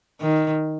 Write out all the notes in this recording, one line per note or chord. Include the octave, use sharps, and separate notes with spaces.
D#3